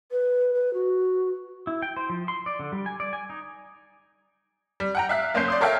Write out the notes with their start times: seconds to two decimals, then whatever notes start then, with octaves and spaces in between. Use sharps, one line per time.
0.12 B4
0.54 B4
0.74 F#4
1.67 E4
1.82 G5
1.97 C5
2.10 F3
2.28 C6
2.46 D5
2.59 D3
2.72 G3
2.86 G#5
3.00 D5
3.13 G#5
3.30 D#4
4.80 G3
4.95 F#5 G5 A#5
5.09 E5 F5 F#6 B6
5.34 F#1 A#3 C#4 C6 G6 C7
5.48 D5 C6 D#6
5.61 A4 A#4 C#5 E5 F5 G5